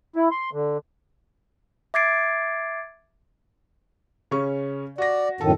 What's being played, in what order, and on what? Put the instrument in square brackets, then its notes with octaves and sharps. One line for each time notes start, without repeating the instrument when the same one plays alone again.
[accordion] E4
C6
D3
[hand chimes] E5 D6 G#6 A6 C7 D7
[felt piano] C#3 C#4 C#6
[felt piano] F#4 A#6 [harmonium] D5
[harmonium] F#2 A2 D#3 [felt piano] A4